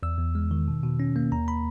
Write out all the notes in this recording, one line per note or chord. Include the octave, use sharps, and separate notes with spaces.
E2 E6
E2
G#3
D#3
B2
B2
C#4
A#3
D#2 A#5
B5